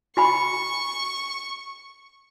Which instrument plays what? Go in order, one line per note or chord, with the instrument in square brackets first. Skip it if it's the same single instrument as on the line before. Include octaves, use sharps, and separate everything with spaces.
[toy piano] F#4 G#5 B5 [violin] C#6